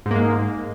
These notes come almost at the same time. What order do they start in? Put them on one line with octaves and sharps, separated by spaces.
G#2 A#3 G#3